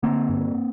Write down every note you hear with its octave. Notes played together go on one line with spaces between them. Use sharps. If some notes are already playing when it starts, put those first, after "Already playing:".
D3 A#3 C4
G2